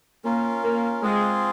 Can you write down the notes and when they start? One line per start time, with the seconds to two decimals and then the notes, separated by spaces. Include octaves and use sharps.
0.24 A#3 C#4 F4 A#4
0.63 A#3
1.03 G#3 C4 F4 G#4